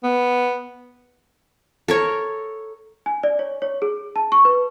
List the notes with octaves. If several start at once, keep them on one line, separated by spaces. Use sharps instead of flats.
B3
A4 A#4 C#5
G#5
D5
C#5
C#5
G#4
A5
C#6
B4